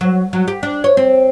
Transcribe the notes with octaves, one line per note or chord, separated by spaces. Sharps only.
F#3
F#3
G4
D4
C#5
C4